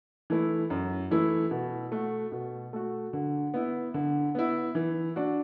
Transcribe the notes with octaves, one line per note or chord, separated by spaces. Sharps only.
E3 A3 E4
F#2
E3 A3 E4
B2
A3 F#4
B2
A3 F#4
D3
B3 E4
D3
B3 E4
E3
D4 F#4